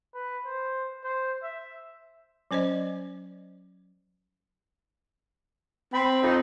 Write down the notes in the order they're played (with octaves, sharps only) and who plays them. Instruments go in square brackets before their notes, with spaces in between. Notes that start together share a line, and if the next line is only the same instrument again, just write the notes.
[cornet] B4
C5
C5
E5
[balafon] F#3 C#4 C5 D5 D#5
[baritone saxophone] C4 [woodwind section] G5 B5
[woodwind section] F2 D#4